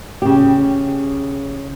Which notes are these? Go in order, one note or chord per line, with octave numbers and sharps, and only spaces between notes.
C#3 G4